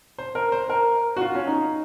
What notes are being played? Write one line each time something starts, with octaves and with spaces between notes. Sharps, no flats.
C5
A#4
C5
A#4
F#4
F4
C#4
D#4